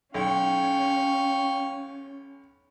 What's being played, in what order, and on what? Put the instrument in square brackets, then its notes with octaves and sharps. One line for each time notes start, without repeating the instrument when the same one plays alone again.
[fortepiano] B1 [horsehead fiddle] C#4 [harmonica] F5 G5 C#6